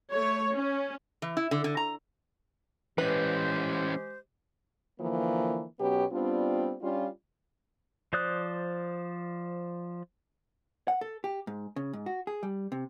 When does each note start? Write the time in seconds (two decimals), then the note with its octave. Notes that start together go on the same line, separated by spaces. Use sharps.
0.12 A3 C#5
0.53 C#4
1.22 E3
1.37 E4
1.51 D3
1.64 D3
1.77 A#5
2.98 E3 G#3 C#4 G4 B4 C5
5.01 D3 E3 F3 A#3
5.80 B2 F#3 B3 C#4 G4
6.12 G3 B3 C4 D4 F4
6.82 G3 C#4 D4 F4
8.13 F3 C5 D5 D#6 F#6
10.88 F#5
11.01 A4
11.24 G4
11.47 G#2
11.76 C#3
11.93 G#2
12.06 F#4
12.27 G#4
12.43 G3
12.72 C3